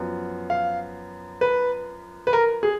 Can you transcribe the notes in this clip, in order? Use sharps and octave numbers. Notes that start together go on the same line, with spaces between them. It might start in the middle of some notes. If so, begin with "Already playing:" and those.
Already playing: F#2 F3 B3
F5
B4
B4
A#4
G#4